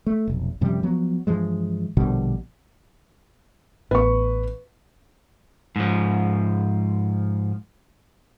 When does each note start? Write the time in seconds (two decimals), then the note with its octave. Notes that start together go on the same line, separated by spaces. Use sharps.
0.07 A3
0.28 F1 B1
0.61 F#2 C3 F3 G3
0.83 F3 F#3 B3
1.27 G2 E3 F3 G#3
1.97 A#1 B2 D3 G3
3.91 A1 B3 B4 C#6
5.76 G#2 F3